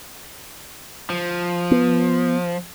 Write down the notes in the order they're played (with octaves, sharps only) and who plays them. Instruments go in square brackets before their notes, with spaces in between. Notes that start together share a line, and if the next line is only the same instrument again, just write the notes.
[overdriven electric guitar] F3
[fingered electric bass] B3